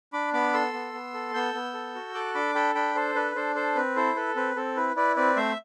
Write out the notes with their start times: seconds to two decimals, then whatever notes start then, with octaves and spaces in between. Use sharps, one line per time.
0.13 D4 B5 D6
0.33 B3 B5 D6
0.54 A4 C6 E6
0.73 B3
0.93 B3
1.14 A4
1.34 B3 E6 G6
1.54 B3
1.74 A4
1.95 F#4
2.14 A4 D6 F#6
2.34 D4 B5 D6
2.55 A4 G5 B5
2.75 D4 G5 B5
2.95 A4 C5
3.15 D4 B4
3.35 D4 A4 C5
3.55 A4 C5
3.75 C4 B4
3.96 E4 A4 C5
4.16 A4 B4
4.36 C4 B4
4.56 C4 A4
4.76 E4 B4
4.96 E4 B4 D5
5.16 C4 B4 D5
5.36 A3 C5 E5